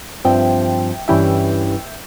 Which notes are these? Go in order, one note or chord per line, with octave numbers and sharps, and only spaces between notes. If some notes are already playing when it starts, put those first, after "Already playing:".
G2 F3 C4 E5 G5
G2 E3 G3 C#4 E4 E5 G5